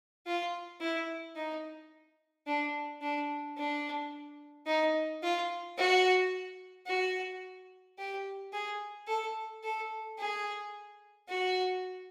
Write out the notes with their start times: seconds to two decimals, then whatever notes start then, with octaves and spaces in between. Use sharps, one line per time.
0.27 F4
0.81 E4
1.37 D#4
2.47 D4
3.02 D4
3.57 D4
4.67 D#4
5.23 F4
5.78 F#4
6.87 F#4
7.99 G4
8.53 G#4
9.08 A4
9.64 A4
10.19 G#4
11.29 F#4